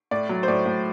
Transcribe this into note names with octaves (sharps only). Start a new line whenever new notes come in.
A2 D5
F#3
C5
A2 D5
A2